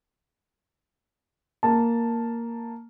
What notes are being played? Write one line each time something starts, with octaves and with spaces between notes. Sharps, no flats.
A#3 A5